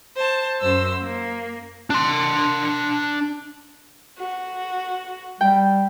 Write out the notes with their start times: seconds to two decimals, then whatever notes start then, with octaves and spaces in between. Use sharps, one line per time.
0.17 C5 A5
0.59 F#2 C5 E6
1.02 A#3
1.90 D4 C6
4.18 F#4
5.41 G3 G5